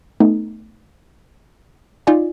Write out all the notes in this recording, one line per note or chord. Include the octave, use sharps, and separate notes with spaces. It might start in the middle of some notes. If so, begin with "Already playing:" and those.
A3 B3 D#4
D#4 F4 D5 G#5